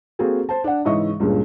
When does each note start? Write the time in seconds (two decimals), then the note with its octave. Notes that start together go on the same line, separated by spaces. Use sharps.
0.19 A#3 C4 F#4 G#4 A4
0.49 C5 A5
0.64 D4 F#5
0.85 G#2 C#3 E3 D#5 E5 C#6
1.20 C#2 G2 A#2 C#3